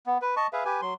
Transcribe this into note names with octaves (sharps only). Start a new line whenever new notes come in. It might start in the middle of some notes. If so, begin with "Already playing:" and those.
B3
B4
D#5 A5 C#6
G#4 B4 E5 F5
G4 B4 G#5
F#3 C6